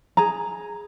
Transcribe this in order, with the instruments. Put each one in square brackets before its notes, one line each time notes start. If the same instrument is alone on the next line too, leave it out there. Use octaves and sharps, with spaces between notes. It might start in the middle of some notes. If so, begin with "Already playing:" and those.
[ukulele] G#4 A#5